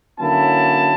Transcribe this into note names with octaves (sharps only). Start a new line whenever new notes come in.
D3 F#3 A#3 C#4 E4 A5